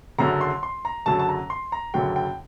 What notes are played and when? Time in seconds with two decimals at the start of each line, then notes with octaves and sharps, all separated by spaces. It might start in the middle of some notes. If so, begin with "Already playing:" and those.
0.18 F#1 F#2 D3 F#3 A#5
0.41 C6
0.63 C6
0.85 A#5
1.06 F#1 F#2 D3 F#3 A5
1.19 A5
1.29 A#5
1.50 C6
1.72 A#5
1.94 F#1 F#2 D3 F#3 G5
2.16 G5